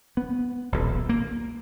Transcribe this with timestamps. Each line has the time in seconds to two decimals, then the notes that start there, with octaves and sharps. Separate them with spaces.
0.17 B3
0.72 D#1 B1
1.09 A#3